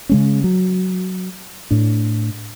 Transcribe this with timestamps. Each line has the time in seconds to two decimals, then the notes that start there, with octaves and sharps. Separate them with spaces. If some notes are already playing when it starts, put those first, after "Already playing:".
0.09 C#3 G#3 C#4
0.44 F#3
1.71 A2 D4